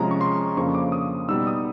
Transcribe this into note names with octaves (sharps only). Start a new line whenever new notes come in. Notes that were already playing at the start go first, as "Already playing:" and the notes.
Already playing: C3 F3 G#3 C#4 A#5
C#6
C6
F2 C#3 F3 A#3 D4 C#6
D6
D#6
B2 G3 B3 D#4 E6
D#6